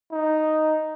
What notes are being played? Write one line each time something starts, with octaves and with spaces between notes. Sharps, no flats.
D#4